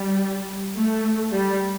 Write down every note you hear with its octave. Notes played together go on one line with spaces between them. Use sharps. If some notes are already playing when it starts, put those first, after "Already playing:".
Already playing: G3
A3
G3